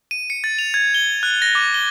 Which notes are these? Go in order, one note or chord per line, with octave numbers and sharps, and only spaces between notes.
D#7
C#7
A6
F7
G#6
G7
F#6
A#6
D6
G7